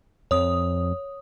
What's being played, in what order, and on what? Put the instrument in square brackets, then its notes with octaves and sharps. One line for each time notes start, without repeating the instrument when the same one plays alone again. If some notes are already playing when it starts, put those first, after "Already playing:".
[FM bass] F2 [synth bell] C#5 D#6